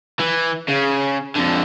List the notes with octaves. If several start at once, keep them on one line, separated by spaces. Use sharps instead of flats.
E3
C#3
F2 D3